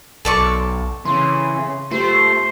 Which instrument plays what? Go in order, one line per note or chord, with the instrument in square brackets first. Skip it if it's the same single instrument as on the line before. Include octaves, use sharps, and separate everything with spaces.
[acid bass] B1 [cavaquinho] A4 D5 C#6
[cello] C#3 [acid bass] E3 [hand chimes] C6
[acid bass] A3 [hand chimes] F4 G4 [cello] C5